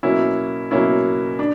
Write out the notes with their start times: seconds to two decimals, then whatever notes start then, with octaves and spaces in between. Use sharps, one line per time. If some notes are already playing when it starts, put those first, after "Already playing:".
0.03 B2 F#3 A#3 C#4 E4
0.71 B2 F#3 A#3 C#4 E4
1.39 D4